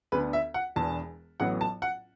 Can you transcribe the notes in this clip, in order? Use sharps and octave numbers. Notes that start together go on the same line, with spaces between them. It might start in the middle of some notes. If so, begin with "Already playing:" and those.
D2 D3 B3 D4 B4
E5
F#5
E1 E2 E3 B3 D4 A5
A1 A2 F#3 B3 F#5
A5
F#5